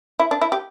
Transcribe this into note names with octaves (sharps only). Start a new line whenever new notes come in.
E4
D4
E4
G4